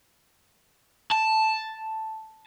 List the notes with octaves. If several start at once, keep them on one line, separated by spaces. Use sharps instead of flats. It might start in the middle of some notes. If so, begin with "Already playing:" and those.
A5